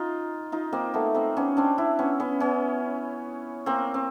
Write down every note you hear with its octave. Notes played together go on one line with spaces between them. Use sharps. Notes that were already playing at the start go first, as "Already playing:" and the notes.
Already playing: D#4 F4
D#4 F4
A#3 C4
A3 B3
A#3 C4
B3 C#4
C4 D4
D4 E4
B3 C#4
B3 C#4
B3 C#4
A#3 C4
C4